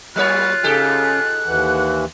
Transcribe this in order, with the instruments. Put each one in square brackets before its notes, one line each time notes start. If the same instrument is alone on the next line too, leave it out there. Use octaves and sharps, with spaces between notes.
[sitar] F#3 A#3 C#5 [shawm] F4 [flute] F#6
[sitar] G#2 G4 A4 [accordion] C#3
[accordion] D#2 E3 [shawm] F#5